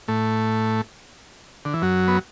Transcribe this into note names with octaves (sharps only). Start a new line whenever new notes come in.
A2 A3
D3
E3
F#2 F#3
B3